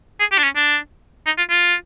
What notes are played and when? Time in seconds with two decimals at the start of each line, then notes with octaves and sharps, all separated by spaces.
0.20 G#4
0.32 G4
0.38 D4
0.44 C#4
0.56 D4
1.26 D#4
1.38 F4
1.50 F4